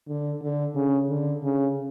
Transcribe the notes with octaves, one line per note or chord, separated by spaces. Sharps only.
D3
D3
C#3
D3
C#3